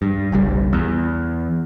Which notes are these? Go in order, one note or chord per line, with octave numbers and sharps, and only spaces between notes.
G2
F#1 B1 G3
E2